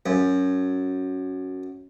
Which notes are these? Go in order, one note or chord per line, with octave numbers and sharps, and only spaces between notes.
F#2